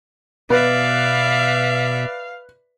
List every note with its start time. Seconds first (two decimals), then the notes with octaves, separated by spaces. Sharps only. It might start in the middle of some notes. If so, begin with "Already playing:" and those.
0.50 B2 B4 D5 E5 F5